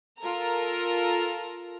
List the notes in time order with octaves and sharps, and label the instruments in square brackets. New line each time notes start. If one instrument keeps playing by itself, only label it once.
[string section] F4 A4 A#4 A#5